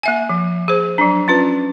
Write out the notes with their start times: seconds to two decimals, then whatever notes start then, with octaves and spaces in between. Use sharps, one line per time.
0.03 A#3 E5 G#5
0.29 F3
0.68 G#4 C5
0.98 F#3 D4
1.28 C#4 F4 B4